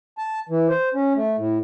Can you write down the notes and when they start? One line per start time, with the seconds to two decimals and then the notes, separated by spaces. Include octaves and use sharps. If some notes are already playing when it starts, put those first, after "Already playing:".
0.18 A5
0.49 E3
0.69 C5
0.94 C#4
1.16 A3
1.38 A2